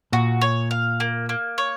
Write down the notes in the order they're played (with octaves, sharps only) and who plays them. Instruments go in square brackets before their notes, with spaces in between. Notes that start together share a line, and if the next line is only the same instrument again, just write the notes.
[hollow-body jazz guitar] A#2 [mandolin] F#4
[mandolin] C#5
F5
A#3
A#3
C#5